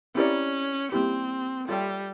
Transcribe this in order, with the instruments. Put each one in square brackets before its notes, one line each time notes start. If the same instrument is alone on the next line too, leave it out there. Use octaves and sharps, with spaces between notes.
[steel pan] C4 E4 G4 A#4 D5 [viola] C#4
[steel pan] G3 A#3 C#4 E4 G4 [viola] C4
[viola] G3 [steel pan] F4 A4 C#5 E5 G5